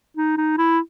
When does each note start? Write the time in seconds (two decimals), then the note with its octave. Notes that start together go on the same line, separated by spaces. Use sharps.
0.17 D#4
0.38 D#4
0.58 E4